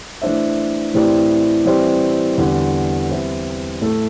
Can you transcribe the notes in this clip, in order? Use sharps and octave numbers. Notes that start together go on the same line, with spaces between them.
E3 A3 D4 C5 E5
A2 E3 C4 G4 D5
E3 G3 C4 G4 D5
E2 D3 G3
E3 G3 C4 E4
A2 A3 E4 A4